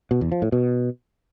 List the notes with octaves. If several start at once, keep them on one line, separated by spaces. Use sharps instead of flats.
B2
E2
F3
A2
B2